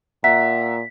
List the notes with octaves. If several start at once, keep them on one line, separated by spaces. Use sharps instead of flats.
A#2 E5 F#5 A#5 B6